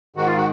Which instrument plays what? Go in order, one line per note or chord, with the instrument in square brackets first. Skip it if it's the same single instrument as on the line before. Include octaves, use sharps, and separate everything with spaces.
[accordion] G#2 D#3 F#4
F4
F#4